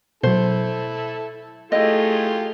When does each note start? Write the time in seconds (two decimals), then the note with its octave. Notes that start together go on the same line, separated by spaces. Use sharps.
0.23 B2 F#3 E4 A4 C5
1.72 A3 E4 F4 G4 G#4 D#5